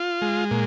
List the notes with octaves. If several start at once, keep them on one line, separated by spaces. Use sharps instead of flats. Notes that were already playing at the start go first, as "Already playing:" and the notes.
Already playing: F4
G#3
A#2